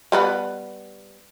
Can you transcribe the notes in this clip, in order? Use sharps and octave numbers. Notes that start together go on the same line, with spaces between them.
G3 B3 B4